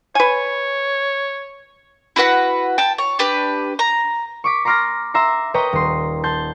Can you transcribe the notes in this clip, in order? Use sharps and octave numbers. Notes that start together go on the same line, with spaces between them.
B4 C#5 G#5
E4 F#4 B4 F#5
G5 A5
C#5
D4 G4 B4
A#5
C#6 D6 B6
A#5 C6 D6 F6 A6 A#6
E5 A#5 C6
B4 C#5 D#5 G5 A#5
D#1 C6
A5 C6 G6